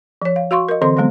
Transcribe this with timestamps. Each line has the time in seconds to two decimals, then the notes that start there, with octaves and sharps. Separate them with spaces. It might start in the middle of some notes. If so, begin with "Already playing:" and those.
0.22 F3 C#5
0.36 F5
0.51 F#4 F5 C6 C#6
0.69 A#4 D#5
0.82 D3 E3 C4 A4 D#5 C6
0.97 D3 F#3 G#3 B3